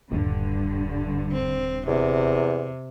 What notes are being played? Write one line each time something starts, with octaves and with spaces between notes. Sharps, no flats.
D#1 G2 D3
C4
E2 C3